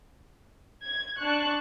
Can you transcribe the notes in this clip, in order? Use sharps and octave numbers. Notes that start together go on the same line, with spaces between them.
G#6
D4 A5 C#6 F#6